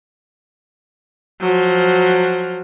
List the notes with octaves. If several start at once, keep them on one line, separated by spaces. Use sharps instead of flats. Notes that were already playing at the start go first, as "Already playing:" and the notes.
F3 F#3